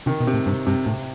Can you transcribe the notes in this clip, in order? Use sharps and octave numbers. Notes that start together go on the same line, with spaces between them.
C3 D#3
B2
C3
A2
G2 C3
G2 C3
A2 C3